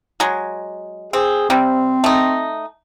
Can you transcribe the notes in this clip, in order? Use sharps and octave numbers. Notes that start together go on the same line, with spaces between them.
F#3 G#3
C4 G#4
C3 G3 C4
A3 D#4